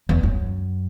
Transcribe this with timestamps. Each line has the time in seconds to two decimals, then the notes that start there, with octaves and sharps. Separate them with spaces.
0.09 E2
0.23 F#2